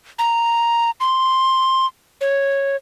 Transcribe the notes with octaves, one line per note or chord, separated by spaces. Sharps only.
A#5
C6
C#5